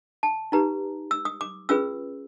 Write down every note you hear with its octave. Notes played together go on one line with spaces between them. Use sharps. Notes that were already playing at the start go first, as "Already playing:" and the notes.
A5
D#4 G4 B4 A#5
E6
D#6
D6
C#4 F4 G#4 B4 E6